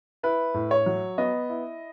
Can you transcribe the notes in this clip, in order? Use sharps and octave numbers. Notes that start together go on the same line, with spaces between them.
E4 B4
A2
C#5
F#3
B3 D#5
E4